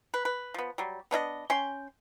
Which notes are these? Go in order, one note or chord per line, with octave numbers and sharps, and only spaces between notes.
B4
B4
F3 B3
F#3 G3
B3 D4 E4 D#5
C#4 G5 C6